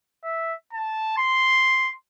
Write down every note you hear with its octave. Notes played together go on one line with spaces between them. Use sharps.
E5
A5
C6